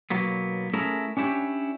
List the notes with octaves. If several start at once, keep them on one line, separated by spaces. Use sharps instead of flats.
B1 F#3 A#3 B3
A3 C#4 E4 G#4 A#4
C#4 D4 E4 G4 C#5